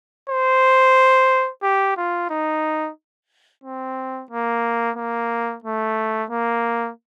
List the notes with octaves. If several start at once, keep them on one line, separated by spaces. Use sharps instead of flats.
C5
G4
F4
D#4
C4
A#3
A#3
A3
A#3